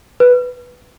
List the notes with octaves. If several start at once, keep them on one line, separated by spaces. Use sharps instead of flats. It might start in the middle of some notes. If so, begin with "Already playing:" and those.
B4